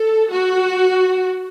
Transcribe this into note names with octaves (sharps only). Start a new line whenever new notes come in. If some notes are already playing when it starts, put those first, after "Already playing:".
Already playing: A4
F#4